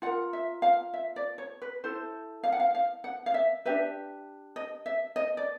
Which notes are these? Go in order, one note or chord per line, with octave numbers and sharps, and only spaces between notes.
F4 A#4 F#5
E5
F5
E5
D5
C#5
B4
E4 A4 C5
F5
F#5
F5
F5
F#5
F5
E5
D4 G4 B4 E5
D#5
E5
D#5
D5